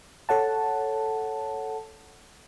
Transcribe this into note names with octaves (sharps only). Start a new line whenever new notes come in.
A4 C#5 F#5 A5